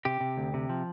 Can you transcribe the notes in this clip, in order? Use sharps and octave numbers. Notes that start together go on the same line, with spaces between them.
C3 G4
C3
D2
C3
F3